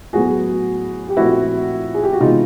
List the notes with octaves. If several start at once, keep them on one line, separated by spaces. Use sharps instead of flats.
A2 F#3 B3 F#4 G#4
G4
A#2 F3 A3 C4 E4 F#4
G#4
G4
F#4
C3 E3 G#3 B3 D#4 F4